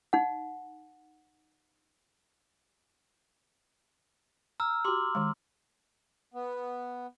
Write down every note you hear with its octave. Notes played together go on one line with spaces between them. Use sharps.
D#4 F#5
A#5 E6 F6
F#4 G4 C6 D6
D#3 G#3
B3